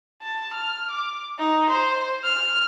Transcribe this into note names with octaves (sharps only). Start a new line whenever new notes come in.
A5
F6
D6
D#4
C5
F6